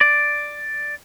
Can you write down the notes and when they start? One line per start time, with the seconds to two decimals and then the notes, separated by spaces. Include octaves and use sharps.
0.01 D5